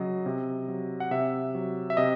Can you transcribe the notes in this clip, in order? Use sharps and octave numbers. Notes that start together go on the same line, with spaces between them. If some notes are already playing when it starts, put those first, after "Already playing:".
Already playing: C#3 F#3 D#5
C3
F#3
F#5
C3 E5
F#3
E5
C3 D#5